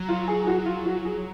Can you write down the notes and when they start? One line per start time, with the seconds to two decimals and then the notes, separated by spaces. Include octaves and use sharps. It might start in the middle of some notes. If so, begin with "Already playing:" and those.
Already playing: F#3
0.09 F4
0.28 G#4
0.44 G#4
0.47 F#4
0.66 F4
0.86 F#4
1.05 G#4